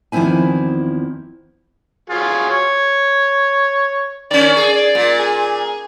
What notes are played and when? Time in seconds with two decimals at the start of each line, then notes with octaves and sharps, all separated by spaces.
0.12 E2 D#3 F3 C4 E4 G#5
2.10 F#3 F4 G#4
2.50 C#5
4.31 D#3 C#4 D5
4.57 G#4
4.73 D5
4.95 A#2
5.20 G#4